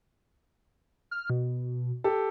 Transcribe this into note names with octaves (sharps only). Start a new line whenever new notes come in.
F6
B2
G4 A4